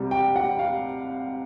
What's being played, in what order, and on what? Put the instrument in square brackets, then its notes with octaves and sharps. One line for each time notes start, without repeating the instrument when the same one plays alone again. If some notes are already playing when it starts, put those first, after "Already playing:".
Already playing: [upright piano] C2 C3 G3
G5
F#5
F5